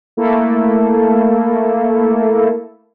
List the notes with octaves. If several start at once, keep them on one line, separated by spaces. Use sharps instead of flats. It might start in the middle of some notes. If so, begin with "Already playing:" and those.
A3 A#3 E4 A4